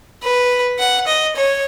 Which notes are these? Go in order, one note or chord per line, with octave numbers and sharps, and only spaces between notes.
B4
F#5
D#5
C#5